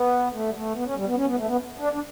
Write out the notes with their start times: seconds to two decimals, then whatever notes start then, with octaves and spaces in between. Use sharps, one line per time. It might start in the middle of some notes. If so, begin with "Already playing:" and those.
Already playing: B3
0.33 A3
0.49 G3
0.54 A3
0.75 B3
0.85 C#4
0.96 G3
1.06 B3
1.16 C#4
1.27 B3
1.37 A3
1.48 B3
1.79 D4
1.93 D4